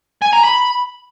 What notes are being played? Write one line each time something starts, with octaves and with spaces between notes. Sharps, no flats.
G#5
A#5
B5